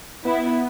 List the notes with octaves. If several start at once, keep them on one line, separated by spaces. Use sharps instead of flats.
B3 E4